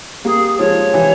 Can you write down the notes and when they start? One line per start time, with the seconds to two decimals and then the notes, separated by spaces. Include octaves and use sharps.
0.25 G3 A#3 G#4
0.59 F3 G#3 C#5
0.94 E3 G3